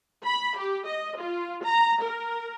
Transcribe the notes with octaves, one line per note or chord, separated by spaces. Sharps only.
B5
G4
D#5
F4
A#5
A#4